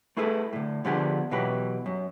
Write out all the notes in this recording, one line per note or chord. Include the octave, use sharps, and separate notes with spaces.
A3 E4 G#4 A4 B4
A2 D3
D3 F3 B3 D4 G4 G#4
B2 E3 F#3 G4 B4
F#2